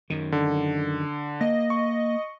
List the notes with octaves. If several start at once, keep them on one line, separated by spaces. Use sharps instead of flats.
F#2 D#3
D3
A#3 D#5
C#6